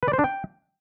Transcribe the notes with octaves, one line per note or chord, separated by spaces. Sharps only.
B4
D5
C5
D4
G5